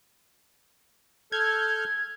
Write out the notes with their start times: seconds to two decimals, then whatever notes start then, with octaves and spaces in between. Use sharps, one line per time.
1.32 A4 F6 G6 G#6